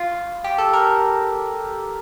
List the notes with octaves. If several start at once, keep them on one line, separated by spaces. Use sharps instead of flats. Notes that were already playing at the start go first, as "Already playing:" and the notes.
Already playing: F4
G4
A4
A#4